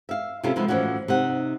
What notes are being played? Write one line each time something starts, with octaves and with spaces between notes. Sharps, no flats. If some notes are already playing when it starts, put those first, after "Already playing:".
E5 F5
C3 C#4 E4 F4 G4 A4
C3 F3 G#3 B3 E4 F4
A2 E3 F3 C#4 F#4
C3 D#4 F#5